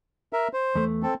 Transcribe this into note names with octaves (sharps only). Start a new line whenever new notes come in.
A#4 E5
C5
E2 A3
C4 A4